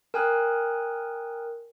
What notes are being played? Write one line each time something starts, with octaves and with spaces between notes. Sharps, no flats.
A#4 G5 G#5 D#6 F#6